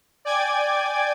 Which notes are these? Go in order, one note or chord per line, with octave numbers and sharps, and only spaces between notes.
D5 G5 G#5 D6 G#6